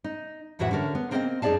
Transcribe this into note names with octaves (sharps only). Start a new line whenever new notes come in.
D#4
F2 A2 E3 F#4 E5 F#5
D3 C#4 A4 A#4
B3
A#3 C4 A#4 D#5 E5 G5
F#2 D#4 G#4 D5 F5 A5